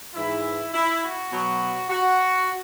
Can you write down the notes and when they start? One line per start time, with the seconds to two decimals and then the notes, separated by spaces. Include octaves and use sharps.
0.15 G#2 E3 E4
0.74 E4
1.03 F#4
1.32 B2 F#3
1.90 F#4